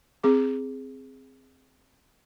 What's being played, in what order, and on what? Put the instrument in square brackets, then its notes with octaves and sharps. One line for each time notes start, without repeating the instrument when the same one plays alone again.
[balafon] C4 G#4 D6